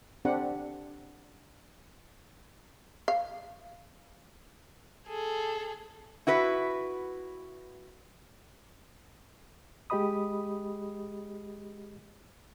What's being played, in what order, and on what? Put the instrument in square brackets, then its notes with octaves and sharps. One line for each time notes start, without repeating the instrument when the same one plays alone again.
[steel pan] C4 D4 G4 A4 F#5
[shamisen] F5
[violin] G#4 A4
[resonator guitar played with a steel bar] E4 F#4 B4
[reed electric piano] G#3 G4 G#4 D#5 B5 D#6